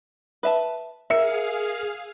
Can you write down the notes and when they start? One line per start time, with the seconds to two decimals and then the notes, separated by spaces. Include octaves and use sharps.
0.43 B4 E5 A5
1.10 G#4 A#4 E5 F5 E6 C#7